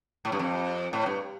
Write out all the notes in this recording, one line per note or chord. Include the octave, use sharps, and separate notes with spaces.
A2
G2
F2
A2
G2